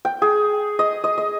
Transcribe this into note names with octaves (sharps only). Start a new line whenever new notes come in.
G5
G#4
D#5
D#5
D#5